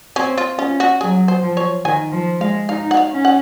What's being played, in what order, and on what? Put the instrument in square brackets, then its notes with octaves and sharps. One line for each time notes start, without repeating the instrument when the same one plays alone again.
[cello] C4 [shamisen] C#4
[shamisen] F4
[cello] C#4 [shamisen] F4
[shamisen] F#4
[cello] F#3 [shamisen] G#4
[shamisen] C5
[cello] F3
[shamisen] C#5
[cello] D#3 [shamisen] G#5
[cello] F3
[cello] G#3 [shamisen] F5
[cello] D#4 [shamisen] F5
[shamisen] F#5
F5
[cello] C#4
[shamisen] F#5